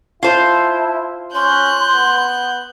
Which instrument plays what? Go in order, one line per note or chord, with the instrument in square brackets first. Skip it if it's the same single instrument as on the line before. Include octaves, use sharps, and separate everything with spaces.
[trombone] E4 [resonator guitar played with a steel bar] F4 C5 [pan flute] A5
[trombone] C#4 [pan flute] C6 [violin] F#6 G6
[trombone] B3